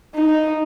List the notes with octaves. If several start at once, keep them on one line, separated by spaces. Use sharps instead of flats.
D#4